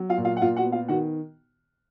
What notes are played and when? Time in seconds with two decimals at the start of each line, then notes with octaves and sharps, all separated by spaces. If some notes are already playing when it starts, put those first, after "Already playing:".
Already playing: F#3
0.09 F4 F5
0.17 A#2
0.25 F4 F5
0.37 F#5
0.42 A#2 F4 F5
0.56 F#4 F#5
0.64 B3
0.72 F4 F5
0.88 D#3 F#4 F#5